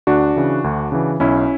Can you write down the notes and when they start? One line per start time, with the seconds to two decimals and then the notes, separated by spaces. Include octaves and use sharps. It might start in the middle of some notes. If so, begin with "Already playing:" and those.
0.07 D2 D4 F#4
0.36 C#3 E3
0.64 D2
0.92 C#3 E3
1.20 B1 C#4 E4